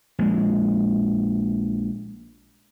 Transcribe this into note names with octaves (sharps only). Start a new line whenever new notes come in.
A#1 G#3